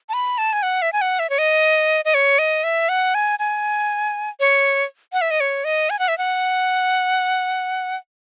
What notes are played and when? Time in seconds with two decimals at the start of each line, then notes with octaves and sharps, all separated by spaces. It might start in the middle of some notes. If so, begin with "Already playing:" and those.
0.09 A5
0.13 B5
0.38 A5
0.53 G#5
0.63 F#5
0.82 E5
0.93 G#5
1.01 F#5
1.19 E5
1.30 C#5
1.38 D#5
2.05 D#5
2.14 C#5
2.39 D#5
2.64 E5
2.89 F#5
3.15 G#5
3.39 G#5
4.40 C#5
5.13 F#5
5.21 E5
5.31 D#5
5.40 C#5
5.65 D#5
5.90 G#5
5.99 F#5
6.08 E5
6.18 F#5